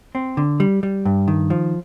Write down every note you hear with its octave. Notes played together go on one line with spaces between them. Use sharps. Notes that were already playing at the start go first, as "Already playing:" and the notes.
C4
D3
G3
G3
G2
D#3
F3